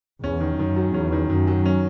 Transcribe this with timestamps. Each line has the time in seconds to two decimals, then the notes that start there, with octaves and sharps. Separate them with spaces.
0.23 E2 C#4
0.40 D#3
0.58 F#2 D#3
0.76 F#3
0.94 E2 C#4
1.12 D#3
1.30 F#2 D#3
1.47 F#3
1.65 C#4